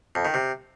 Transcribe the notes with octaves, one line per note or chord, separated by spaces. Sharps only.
F2
D#3
C3